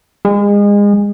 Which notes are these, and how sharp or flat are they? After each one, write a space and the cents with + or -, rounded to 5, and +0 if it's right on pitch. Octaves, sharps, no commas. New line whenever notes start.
G#3 -30